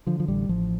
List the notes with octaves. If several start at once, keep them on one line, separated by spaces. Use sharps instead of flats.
D3 F3
F3
A1 G3
A1 F3